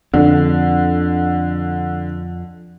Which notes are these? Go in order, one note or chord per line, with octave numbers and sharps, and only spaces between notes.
F2 D3